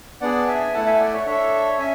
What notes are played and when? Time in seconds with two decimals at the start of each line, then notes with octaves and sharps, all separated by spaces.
0.21 B3 D4 G#4 D5 F#5
0.47 E5 G#5
0.74 A3 E4 A4 F#5 A5
0.87 E5 G#5
1.00 D5 F#5
1.13 C#5 E5
1.26 D4 A4 C#5 E5
1.79 C#4 E5 G#5